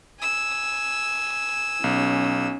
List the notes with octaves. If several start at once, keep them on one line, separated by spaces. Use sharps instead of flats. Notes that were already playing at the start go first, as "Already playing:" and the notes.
G#5 E6
B1 C#4